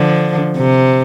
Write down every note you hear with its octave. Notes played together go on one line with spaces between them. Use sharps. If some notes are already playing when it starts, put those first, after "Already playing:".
Already playing: D3 F3
C3